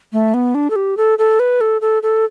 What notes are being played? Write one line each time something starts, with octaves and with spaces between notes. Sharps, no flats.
A3
B3
D4
A4
G4
A4
A4
B4
A4
A4
A4